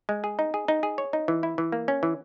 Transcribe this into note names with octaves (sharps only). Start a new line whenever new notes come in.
G#3
G#4
D#4
G#4
D#4
G#4
C#5
D#4
E3
E4
E3
A#3
C#4
E3